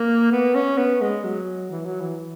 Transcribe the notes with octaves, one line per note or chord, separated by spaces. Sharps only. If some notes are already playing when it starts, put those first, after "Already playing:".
Already playing: A#3
B3
C#4
B3
G#3
F#3
E3
F#3
E3